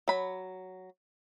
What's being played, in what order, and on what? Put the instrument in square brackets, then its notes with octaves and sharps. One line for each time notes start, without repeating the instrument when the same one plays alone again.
[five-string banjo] F#3 B5